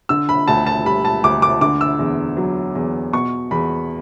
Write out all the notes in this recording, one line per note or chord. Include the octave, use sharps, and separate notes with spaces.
D3 E6
B5
D2 A5
A5
G3 B5
A5
D2 D6
D6
D3 D6
E6
E2
F#3
E2
B2 C#6
E2 B5